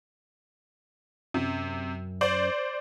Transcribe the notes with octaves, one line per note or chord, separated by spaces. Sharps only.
F#2 C3
C5 D5